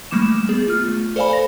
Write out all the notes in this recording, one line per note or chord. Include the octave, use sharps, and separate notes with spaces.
G3 A3 A#3 D6 E7
B3 G#4
F4 F6
A3
A4 C5 D5 F5 G#5 B5
A#6